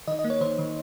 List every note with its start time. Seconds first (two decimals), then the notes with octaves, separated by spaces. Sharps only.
0.07 D#3 D#5
0.19 D#5
0.24 A#3
0.30 C#5
0.41 D#3 C5
0.58 D#3